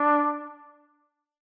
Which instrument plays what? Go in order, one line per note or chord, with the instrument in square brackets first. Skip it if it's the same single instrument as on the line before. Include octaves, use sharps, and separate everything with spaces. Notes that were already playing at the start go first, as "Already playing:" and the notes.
Already playing: [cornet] D4